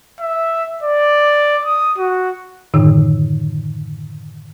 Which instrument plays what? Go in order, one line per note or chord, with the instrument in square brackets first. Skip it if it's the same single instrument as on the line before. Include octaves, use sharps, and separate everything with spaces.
[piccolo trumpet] E5
D5
D#6
F#4
[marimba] F#2 A2 D3 D#3 D#4 E6